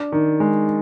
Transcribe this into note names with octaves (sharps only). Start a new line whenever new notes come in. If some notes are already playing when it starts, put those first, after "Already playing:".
Already playing: D4
D#3
G#3